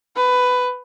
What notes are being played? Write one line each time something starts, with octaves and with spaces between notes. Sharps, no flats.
B4